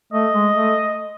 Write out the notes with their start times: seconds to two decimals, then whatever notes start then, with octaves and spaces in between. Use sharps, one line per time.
0.13 A3 D#5
0.34 G#3
0.54 A3